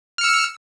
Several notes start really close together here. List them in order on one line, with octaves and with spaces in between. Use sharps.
F6 C#7 E6